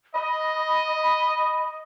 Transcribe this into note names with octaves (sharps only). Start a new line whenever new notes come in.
D#5 B5